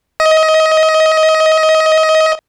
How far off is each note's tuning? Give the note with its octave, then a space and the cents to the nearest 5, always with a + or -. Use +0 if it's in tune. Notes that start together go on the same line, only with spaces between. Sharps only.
D#5 +25